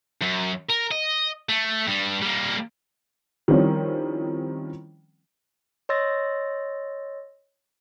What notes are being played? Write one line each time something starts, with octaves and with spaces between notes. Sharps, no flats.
F#2
A#4
D#5
A3
G2 G3
G3 A#3
D#3 F3 G3 C4 C#4 E4
C#5 D#5 C6 E6 A6 A#6